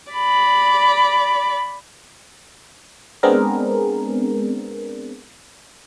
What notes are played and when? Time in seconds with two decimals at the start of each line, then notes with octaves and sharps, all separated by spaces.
0.11 D5 B5
3.23 G#3 B3 C4 D4 G#4 A#4